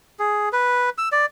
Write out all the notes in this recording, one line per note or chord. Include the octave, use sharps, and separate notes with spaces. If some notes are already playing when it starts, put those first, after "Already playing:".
G#4
B4
E6
D5